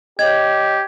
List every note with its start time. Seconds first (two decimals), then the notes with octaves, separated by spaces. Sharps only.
0.19 G4 C#5 D#5 G#6